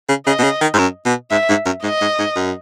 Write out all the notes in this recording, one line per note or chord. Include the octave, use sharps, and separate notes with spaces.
C#3
C#3 D#5
B2
C#3
D#3
G#2
F#2
B2
G#2 E5
G#2
F#2
G#2 D#5
G#2
G#2
F#2